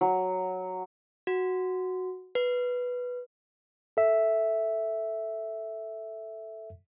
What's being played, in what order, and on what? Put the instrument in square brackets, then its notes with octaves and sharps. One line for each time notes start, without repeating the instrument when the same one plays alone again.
[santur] F#3
[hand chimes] F#4
B4
[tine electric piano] A4 E5